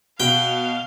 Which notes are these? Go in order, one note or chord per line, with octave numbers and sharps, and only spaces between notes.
B2 F5 G5